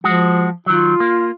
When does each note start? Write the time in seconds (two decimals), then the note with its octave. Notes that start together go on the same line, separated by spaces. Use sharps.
0.04 F3 G#3 F#4
0.66 D#3 F#3 F4
1.00 A#3